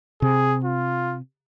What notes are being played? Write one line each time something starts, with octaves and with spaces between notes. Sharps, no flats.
C3 G#4
F4